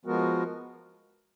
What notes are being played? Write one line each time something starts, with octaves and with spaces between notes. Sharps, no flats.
F3 G#3 B3 F#4 A#4